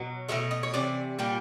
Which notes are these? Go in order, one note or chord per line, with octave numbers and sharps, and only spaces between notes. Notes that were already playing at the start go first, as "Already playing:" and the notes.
Already playing: B2 F#3
B2 F#3 A3 E5
D#5
C#5
C3 E3 D5
A#2 G3 A#3